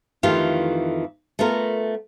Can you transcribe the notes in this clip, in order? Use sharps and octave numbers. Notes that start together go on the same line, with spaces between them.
F2 D#3 E3 A3 F4 G4
A3 B3 F4 A#4